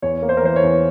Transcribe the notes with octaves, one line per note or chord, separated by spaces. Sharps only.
E2 C#5
A#3
C5
A#4
E3 C5
C#5
E2